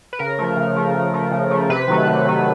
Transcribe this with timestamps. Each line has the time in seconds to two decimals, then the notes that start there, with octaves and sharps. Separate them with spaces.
0.13 B4
0.19 C#3 A#4
0.39 F3 A3
0.57 C#3
0.76 F3 A3
0.94 C#3
1.14 F3 A3
1.31 C#3
1.51 F3 A3
1.70 C3 B4
1.88 D#3 F#3 A3
2.08 C3
2.26 D#3 F#3 A3